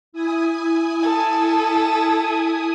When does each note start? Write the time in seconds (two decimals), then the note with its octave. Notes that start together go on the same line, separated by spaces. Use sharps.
0.13 E4 G#5 D#6
1.03 A4